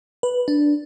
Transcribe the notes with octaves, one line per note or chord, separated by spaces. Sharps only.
B4
D4